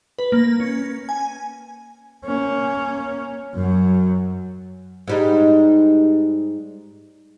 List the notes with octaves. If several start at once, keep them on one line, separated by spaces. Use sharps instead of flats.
B4
A#3
C#4
G#5
A#3 C#4
F#2 F#3
G#2 G3 D#4